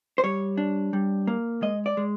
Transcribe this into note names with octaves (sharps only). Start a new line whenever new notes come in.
C5
G3 C#5
D4
G3
A#3
G#3 D#5
D5
G#3